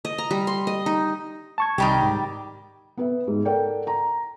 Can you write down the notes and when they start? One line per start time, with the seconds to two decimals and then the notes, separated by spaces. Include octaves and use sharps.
0.05 D#5
0.18 A#5
0.31 G3
0.47 C6
0.67 D#5
0.86 D#4
1.58 A5 C#6 G#6
1.78 C2 D#3 G3 G4
2.02 G#2
2.97 B3 B4 E5
3.27 G#2
3.45 A4 A#4 D5 F#5 G5
3.87 A#5